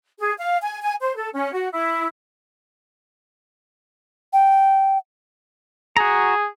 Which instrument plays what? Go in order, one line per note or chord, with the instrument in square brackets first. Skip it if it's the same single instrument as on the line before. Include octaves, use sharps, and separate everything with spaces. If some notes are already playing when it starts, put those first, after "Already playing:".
[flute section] G#4
F5
G#5
G#5
C5
A4
C#4
F#4
E4
[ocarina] G5
[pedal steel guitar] F#4 A#5 [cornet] G#4